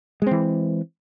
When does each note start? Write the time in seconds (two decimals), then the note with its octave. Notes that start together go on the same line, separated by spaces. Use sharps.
0.22 G#3
0.27 C4
0.31 E3